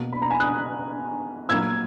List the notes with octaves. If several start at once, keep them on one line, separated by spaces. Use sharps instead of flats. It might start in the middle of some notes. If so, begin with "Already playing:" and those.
Already playing: B2 A#3
B5
A#5
G#5 B5
D#6 F#6
A#2 F#3 A#3 E6 G#6